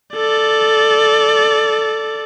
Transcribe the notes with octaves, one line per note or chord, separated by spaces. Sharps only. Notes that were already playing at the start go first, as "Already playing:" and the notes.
A4 D5